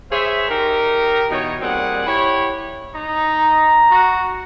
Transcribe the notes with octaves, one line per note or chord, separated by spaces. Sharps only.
G#4 C5 C#5 E5
D#4 G4 A#4
B2 E3 D#4 C#5
A#2 G3 C4 G#4 F#5
E4 G4 C#5
D#4
A#5
F#4